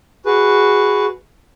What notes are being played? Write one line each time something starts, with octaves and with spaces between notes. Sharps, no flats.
F#4 G#4 B4